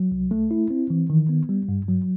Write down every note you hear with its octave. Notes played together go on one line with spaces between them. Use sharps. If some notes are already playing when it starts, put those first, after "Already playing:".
Already playing: F#3
C2
A3
E4
C4
E3
D#3
B3
G3
G2
F#3